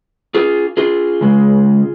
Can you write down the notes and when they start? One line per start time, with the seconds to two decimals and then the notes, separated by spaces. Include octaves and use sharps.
0.35 F4 G#4
0.77 F4 G#4
1.21 C#3 G#3